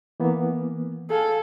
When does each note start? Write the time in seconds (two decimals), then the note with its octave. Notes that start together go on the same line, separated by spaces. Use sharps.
0.20 E3 A#3 B3
1.10 G#4 A4 F5 G#5